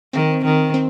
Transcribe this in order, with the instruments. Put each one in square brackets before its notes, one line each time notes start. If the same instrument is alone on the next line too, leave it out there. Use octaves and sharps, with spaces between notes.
[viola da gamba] D#3 [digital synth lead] C4
[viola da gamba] D#3
[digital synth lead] C4